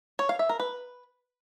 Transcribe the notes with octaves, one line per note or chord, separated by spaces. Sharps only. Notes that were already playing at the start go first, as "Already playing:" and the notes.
C#5
F5
E5
A#4
B4